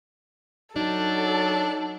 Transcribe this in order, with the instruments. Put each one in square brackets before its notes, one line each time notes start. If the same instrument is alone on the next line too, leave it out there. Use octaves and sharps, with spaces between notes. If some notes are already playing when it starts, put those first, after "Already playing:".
[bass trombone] F#3 [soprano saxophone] D4 [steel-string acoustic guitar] D#4 [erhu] A4